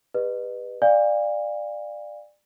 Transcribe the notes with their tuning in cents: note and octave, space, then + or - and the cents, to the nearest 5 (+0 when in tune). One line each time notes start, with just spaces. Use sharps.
G4 +40 B4 +0 D#5 -35
D5 +20 F5 +0 G#5 -40